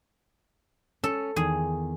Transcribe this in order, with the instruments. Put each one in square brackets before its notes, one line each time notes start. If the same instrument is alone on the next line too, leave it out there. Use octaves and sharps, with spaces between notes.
[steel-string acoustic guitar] C#4 [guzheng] A4
[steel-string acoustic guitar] E2 D#3 [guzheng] G#4